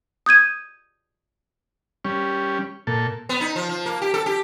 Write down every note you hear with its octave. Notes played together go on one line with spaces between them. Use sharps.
D#6 G6 G#6 D#7
G3 C#4
A#2 A4
B3
D#4
F3
F3
A#3
G4
A4
G4